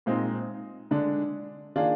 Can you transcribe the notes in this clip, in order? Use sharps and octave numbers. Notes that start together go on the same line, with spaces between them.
A#2 G#3 C4 D#4
D3 G#3 D4
D#3 A#3 D4 F4 G#4